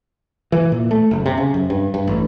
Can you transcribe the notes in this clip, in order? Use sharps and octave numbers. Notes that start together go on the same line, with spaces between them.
E3
A#2
A3
F#1
C3
C#3
F#2
G2
G2
A1